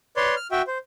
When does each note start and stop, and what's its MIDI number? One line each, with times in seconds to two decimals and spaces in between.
0.17 0.35 71
0.17 0.35 73
0.17 0.35 74
0.17 0.35 84
0.36 0.47 89
0.51 0.62 66
0.51 0.62 76
0.51 0.62 79
0.67 0.78 72